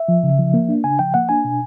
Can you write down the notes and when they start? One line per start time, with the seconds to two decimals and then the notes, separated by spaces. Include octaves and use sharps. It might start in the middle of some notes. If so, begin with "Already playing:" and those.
Already playing: E5
0.08 F3
0.23 C#3
0.39 F3
0.54 A#3
0.69 D4
0.84 C#3 G#5
0.99 F3 G5
1.14 A#3 F#5
1.29 D4 G#5
1.44 B2